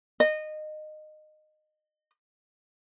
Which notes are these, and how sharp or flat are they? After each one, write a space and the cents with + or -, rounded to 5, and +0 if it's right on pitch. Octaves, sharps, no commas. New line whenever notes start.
D#5 -20